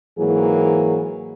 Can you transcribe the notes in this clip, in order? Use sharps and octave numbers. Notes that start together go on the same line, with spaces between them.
G#2 E3 F#3 A#3 G#4